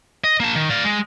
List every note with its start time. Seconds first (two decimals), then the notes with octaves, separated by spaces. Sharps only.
0.24 D#5
0.40 A#3 A5
0.55 D#3
0.70 D5 F5
0.84 G#3